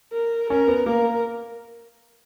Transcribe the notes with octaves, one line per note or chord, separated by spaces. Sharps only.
A#4
C#4 A#4
B3
A#3 A#4